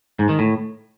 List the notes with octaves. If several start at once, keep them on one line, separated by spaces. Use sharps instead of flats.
G#2
D#3
A2